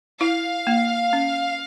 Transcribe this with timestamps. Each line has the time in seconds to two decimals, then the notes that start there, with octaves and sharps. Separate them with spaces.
0.21 E4 F5
0.67 A#3
1.13 C#4